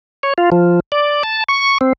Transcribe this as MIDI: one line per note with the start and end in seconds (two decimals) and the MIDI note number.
0.23 0.34 73
0.38 0.50 65
0.52 0.80 53
0.92 1.23 74
1.23 1.44 81
1.48 1.78 85
1.81 1.93 60